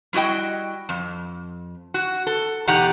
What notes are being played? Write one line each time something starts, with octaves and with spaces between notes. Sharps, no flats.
G3 E4 F#4 D#5 G5
F2
F#4
A4
E2 B2 D#4 G4 F#5 A#5